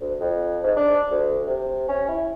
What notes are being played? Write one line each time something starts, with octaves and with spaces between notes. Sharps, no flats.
D2
F2
G#2
D4
D2
C3
C#4
E4